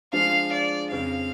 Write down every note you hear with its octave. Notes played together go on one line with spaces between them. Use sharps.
F3 G#3 D4 F4 G#4 F5
D5
F2 C#3 F3 F5